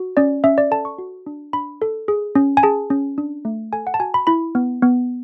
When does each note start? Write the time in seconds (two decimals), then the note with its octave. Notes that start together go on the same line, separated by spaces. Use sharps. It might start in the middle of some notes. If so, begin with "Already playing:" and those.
Already playing: F#4
0.17 C#4 D5
0.44 C#4 E5
0.58 D5
0.71 A4 A5
0.85 C#6
0.98 F#4
1.27 D4
1.53 D4 B5
1.82 A4
2.08 G#4
2.35 C#4
2.57 G#5
2.63 G#4 A5
2.90 C#4
3.18 D4
3.45 A3
3.73 A4 G#5
3.87 F#5
3.94 A5
4.00 F#4 G#5
4.14 B5
4.27 E4 B5
4.55 B3
4.83 B3